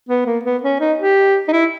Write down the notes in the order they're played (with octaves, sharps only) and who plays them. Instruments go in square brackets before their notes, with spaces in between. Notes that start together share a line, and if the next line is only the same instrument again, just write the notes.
[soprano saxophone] B3
A#3
B3
C#4
D#4
G4
D#4
E4